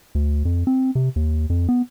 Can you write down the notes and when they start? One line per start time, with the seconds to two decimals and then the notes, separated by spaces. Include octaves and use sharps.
0.15 D2
0.45 F2
0.67 C4
0.95 C3
1.16 D#2
1.50 F2
1.69 B3